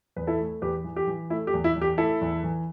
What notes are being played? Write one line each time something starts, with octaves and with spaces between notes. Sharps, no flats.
E2 B4
E4 A4
A3
E2 G4 B4
E3
G4
E3
A3 E4
G4
E2
E4
E2
G4
A3 E4 A4
E2
E3